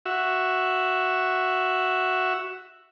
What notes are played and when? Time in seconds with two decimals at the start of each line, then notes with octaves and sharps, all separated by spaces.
0.06 F#4 E5